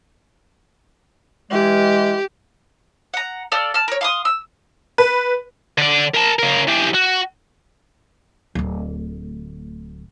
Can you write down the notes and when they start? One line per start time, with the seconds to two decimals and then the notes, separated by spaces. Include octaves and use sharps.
1.51 E3 G#3 G4
3.14 F#5 A#5
3.52 A4 D5 F5 E6
3.74 A5 F6
3.88 A#4 C#5
4.01 F5 C6 D#6
4.25 E6
4.98 B4
5.78 D3 D5
6.14 A#4 A5
6.39 C#3 A#4
6.67 E3 G4
6.94 F#4
8.55 D1 D2